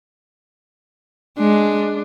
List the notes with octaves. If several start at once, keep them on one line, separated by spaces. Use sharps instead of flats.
G#3 D4